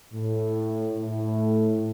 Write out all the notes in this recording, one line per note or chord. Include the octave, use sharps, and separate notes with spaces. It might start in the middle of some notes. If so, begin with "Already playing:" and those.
A2
A2